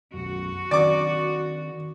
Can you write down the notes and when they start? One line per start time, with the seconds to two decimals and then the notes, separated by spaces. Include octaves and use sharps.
0.14 B1 F#2 F#4
0.71 D#3 C4 D4 D5 D6